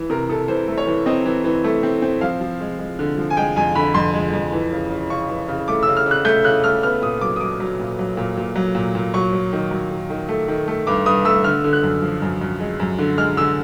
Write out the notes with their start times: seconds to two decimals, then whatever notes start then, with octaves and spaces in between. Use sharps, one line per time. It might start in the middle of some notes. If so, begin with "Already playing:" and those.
Already playing: E3
0.10 C3 A#4
0.29 C3 A4
0.48 E3 C5
0.68 A3
0.78 C#5
0.87 E3
1.06 C4 D#5
1.25 E3
1.44 E3
1.64 A3
1.83 C4
2.02 C4
2.21 F3 F5
2.40 F3
2.61 G#3
2.79 G#3
2.99 D3
3.18 F3
3.30 G#5
3.37 G#3 G5
3.56 F2 G#5
3.75 D3 B5
3.94 F2 C6
4.14 G#3
4.33 F2
4.53 E3
4.72 C#3
4.90 C#3
5.10 C#3 C#6
5.29 E3
5.48 C#3
5.68 A3 D6
5.83 E6
5.87 C#3
5.97 F6
6.06 C#3
6.11 F#6
6.25 A3 G6
6.44 C#3 F#6
6.64 A3 F6
6.83 B3 F6
7.02 A#2 D#6
7.21 F#3 D6
7.36 D#6
7.41 F#3 D6
7.60 F#3
7.79 A#2
7.99 F#3
8.17 A#2
8.37 A#2
8.56 F#3
8.75 A#2
8.95 A#2
9.14 F#3 C#6
9.33 F#3
9.53 D#3
9.71 F#3
9.91 D#3
10.10 D#3
10.29 A3
10.48 D#3
10.68 A3
10.87 G2 D6
11.06 G2 D#6
11.25 A3 E6
11.44 D3 F6
11.64 D3
11.73 F#6
11.83 F#2
12.02 F3
12.22 F#2
12.41 F#2
12.60 G#3
12.80 F#2
12.99 D3
13.17 G#3 F6
13.37 D3 E6